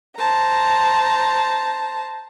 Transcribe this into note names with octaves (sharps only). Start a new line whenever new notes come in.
C5 A5 A#5